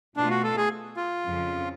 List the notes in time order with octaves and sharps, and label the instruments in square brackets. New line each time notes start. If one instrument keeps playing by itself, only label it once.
[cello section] B2 A3 F4 [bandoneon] D4
[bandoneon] F#4
A4
G#4
F4
[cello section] F2 C#3 F3